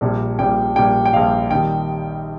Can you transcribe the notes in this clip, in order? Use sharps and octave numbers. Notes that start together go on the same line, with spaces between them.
A#1 A#2 G3
A#1 A#2 G3 G5
A#1 A#2 G3 G5
G5
A#1 A#2 G3 F5
D#2 D#3 G3 G5